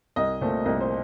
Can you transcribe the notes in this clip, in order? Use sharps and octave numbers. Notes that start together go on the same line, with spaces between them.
C2 D#5
A#2 A3 C4
C2 D#5
C5